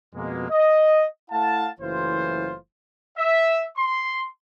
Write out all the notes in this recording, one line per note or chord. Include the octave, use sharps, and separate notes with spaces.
F2 B2 G#3 A#3
D#5
A3 E4 F5 F#5 A5
F#1 E3 F#3 A3 F4 C5
E5
C6